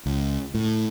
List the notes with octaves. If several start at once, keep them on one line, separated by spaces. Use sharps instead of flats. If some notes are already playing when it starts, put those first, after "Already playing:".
C#2
A2